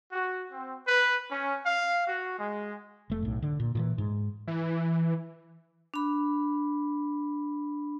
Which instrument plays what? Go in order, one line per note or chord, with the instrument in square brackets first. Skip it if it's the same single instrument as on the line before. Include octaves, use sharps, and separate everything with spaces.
[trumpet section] F#4
C4
B4
C#4
F5
F#4
G#3
[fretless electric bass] F1 A3
B1 A2
D3
A#2
A#2 D3 E3
G#2
[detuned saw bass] E3
[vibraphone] D4 B5